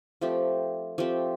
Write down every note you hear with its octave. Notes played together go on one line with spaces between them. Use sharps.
F3 A3 C4 G4
F3 A3 C4 G4